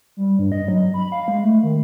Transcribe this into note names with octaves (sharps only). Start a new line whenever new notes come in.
G3
G2
D#5
F#3
B5
F5
G#3
A3
D#3